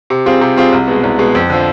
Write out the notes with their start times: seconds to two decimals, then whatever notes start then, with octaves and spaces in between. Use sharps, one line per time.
0.10 C3
0.26 G3 C4 F4 G#4
0.41 C3
0.57 G3 C4 F4 G#4
0.73 C2
0.88 B2 G#3
1.03 C2
1.19 B2 G#3
1.35 F2
1.50 D3 F3